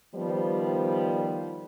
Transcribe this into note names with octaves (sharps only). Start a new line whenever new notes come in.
D#3 F3 G3 B3 C5